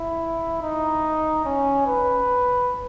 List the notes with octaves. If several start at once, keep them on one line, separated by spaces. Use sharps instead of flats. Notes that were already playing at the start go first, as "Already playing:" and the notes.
Already playing: E4
D#4
C#4
B4